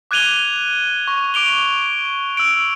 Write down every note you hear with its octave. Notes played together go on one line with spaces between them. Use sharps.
D6 F#6 G#6 D#7 F7 G7
C#6
D6 D7 F7 G7
E6 D7